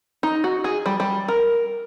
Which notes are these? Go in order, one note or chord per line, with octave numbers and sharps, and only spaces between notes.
D#4
F#4
G#4
G3
G3
A#4